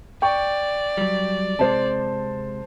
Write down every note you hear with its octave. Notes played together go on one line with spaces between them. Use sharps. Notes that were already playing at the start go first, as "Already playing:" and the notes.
D5 G5 C#6
F#3 G3
C3 G#3 C5 A5